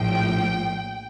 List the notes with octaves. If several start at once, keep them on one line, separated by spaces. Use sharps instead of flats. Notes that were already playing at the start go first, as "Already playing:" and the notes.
Already playing: A#1 A2 F3 G5